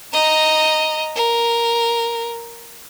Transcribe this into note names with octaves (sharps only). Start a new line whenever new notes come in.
D#5 A#5
A#4